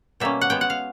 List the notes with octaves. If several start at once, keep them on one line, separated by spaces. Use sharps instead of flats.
B2 G3 A#3 C#4 E5
F#5
B2 G#3 B3 G5
F#5
F5